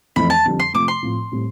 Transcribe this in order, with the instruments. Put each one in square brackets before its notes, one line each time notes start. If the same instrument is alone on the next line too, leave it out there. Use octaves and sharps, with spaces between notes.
[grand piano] F2 E3 A3 [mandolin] B5
[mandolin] A5
[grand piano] F2 D3 G3
[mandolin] C6
[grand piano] C3 F3 A3 [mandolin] D6
[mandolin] C6
[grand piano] A2 F3 C4
A2 G3 C4